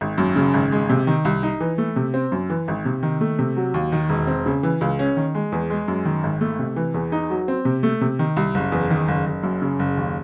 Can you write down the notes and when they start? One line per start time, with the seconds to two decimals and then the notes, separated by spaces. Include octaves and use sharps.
0.01 G#1
0.18 F#2
0.36 C#3
0.54 G#1
0.72 G#3
0.89 C3
1.07 D#3
1.25 C2
1.43 D#4
1.60 E3
1.78 A3
1.96 C3
2.14 C4
2.32 F#2
2.50 E3
2.68 G#1
2.85 C3
3.03 D#3
3.21 A3
3.39 C3
3.56 F#3
3.74 D#2
3.92 D#3
4.09 E1
4.27 C4
4.46 C#3
4.63 E3
4.81 C#2
4.99 C#4
5.17 D#3
5.35 G#3
5.52 E2
5.70 G#3
5.88 F#2
6.05 D#3
6.24 G#1
6.41 A3
6.59 C3
6.76 E3
6.94 E2
7.12 D#4
7.30 F#3
7.48 C4
7.65 C3
7.83 A3
8.01 C3
8.19 D#3
8.36 C2
8.54 F#1
8.72 E2
8.90 D#3
9.08 F#1
9.26 F#1
9.43 F#2
9.62 C#3
9.79 F#1
9.97 D#2